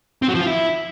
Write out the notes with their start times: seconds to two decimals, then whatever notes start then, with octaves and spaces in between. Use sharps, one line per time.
0.22 C4
0.28 F#3
0.35 F3
0.41 F4
0.47 E4